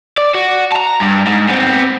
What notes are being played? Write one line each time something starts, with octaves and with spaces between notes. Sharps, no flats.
D5
F#4
A5 A#5
G2
G#2
B3 C4